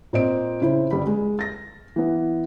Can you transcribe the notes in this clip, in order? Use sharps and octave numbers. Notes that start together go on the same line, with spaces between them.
A#2 C4 D#5 D7
C#3 E4 C5
G1 G3 B5
G#3
A6 A#6
E3 B3